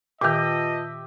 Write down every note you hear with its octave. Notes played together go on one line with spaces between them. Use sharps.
A#2 D#3 F4 G4 B4 D#5 E5 A5